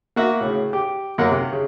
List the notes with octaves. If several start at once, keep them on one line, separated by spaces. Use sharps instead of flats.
A#3 F#4 E5
A2 C#3
G4
F#2 A#3 F#5
C3
C#3